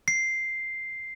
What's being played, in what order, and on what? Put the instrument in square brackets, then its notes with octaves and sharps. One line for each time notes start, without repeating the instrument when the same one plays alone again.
[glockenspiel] C7